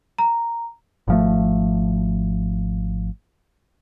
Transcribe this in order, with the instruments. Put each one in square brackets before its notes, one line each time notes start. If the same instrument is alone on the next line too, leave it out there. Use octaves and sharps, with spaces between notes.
[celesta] A#5
[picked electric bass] G#1 F3 A3